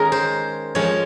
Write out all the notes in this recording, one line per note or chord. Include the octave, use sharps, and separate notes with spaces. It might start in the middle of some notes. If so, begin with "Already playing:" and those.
Already playing: D#3 G#3 C#4 G#4 A#4
C5
F3 G#3 C#4 C#5